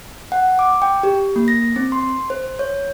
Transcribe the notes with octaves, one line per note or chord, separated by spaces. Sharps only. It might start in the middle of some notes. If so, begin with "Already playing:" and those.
F#5
D6
G5
G4
A#3
A#6
C4
C6
C5
C#5